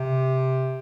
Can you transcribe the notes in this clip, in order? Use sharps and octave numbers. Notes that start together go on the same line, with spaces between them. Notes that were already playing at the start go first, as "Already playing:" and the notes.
Already playing: C3